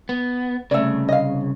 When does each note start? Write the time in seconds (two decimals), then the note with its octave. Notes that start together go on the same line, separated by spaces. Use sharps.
0.09 B3
0.71 C2 C#3 A3 D5
1.09 D#5 F5